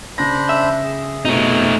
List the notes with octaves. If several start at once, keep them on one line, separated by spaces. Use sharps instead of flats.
C#3 D4 C5 B5 A#6
E5
G#4
B2 A3 D#4